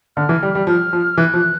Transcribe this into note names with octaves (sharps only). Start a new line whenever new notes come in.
D3 F6
E3
G3
G3
F3 F6
F3
E3 F#6
F3